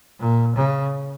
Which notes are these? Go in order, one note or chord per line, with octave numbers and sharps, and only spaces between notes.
A#2
C#3